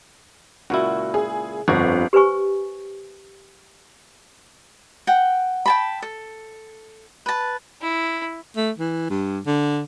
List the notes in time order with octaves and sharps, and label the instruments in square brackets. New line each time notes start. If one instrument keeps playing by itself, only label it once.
[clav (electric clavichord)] C#2 A#2 E4 [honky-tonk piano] F#4
[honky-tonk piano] G#4
[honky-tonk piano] G1 [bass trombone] F2 [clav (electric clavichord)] F#4 A#5
[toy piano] G4 B4 C5 G#5 C#6
[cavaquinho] F#5 G5
G5 A5 B5
A4
B4 A5
[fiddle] E4
[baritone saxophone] A3
E3
G2
D3